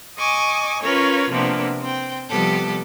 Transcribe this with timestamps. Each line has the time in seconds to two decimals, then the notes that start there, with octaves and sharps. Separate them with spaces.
0.18 D#5 G#5 C#6 D6
0.82 C#4 F4 A#4 B4 C#5
1.32 C3 F3 A#3 B3 D4
1.81 C4 G5
2.29 C3 F3 G3 B3 G4 A4